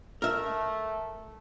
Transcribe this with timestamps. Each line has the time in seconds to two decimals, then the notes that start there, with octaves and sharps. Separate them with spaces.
0.22 A3 A#4 E5